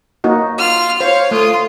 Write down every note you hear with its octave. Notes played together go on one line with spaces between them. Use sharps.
A#3 D#4 F#4
F4 F6
C5 C#5 F5
A3 F4 D#6